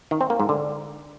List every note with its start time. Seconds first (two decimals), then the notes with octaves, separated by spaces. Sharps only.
0.11 D#3
0.21 C4
0.30 A#3
0.40 G#2
0.49 D3